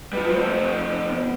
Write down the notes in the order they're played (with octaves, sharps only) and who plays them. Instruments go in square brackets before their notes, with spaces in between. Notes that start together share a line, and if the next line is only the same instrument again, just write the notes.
[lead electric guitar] G3 F4 [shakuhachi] B4
[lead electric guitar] F3 A3 [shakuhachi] C5
[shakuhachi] B3